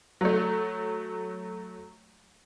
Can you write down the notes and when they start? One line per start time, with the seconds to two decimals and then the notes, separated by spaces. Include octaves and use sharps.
0.21 F#3 A3